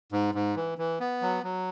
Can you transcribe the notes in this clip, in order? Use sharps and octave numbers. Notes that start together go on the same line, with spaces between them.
G#2
G#2
E3
E3
B3
F#3
F#3